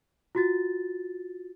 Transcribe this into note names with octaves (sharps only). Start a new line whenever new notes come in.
F4 F#4 A6